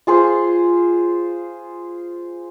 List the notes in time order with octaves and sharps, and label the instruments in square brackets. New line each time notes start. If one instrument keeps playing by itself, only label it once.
[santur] F4 G#4 C5